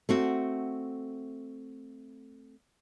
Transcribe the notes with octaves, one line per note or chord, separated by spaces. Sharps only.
A3 C4 F#4